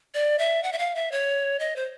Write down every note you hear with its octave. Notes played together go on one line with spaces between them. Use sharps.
D5
E5
F#5
E5
F5
E5
C#5
D#5
C5